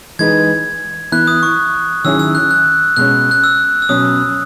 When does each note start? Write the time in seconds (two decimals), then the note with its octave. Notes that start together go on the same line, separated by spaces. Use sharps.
0.19 E3 G#3 D#4 G#4 B4 G#6
1.12 E3 B3 E4 F#6
1.27 D#6
1.43 C#6
2.05 D#3 F#3 C#4 E4 G#4 E6
2.19 E6
2.35 F#6
2.51 F#6
2.97 B2 G#3 C#4 F#6
3.31 F#6
3.44 E6
3.82 E6
3.89 B2 F#3 C#4 D#6